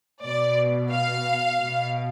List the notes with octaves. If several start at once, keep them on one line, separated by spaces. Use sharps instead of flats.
B2 D5
F5
B2